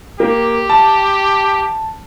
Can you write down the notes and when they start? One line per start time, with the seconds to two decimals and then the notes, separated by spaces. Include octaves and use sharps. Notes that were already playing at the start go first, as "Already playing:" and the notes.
0.20 A#3 G4
0.69 A5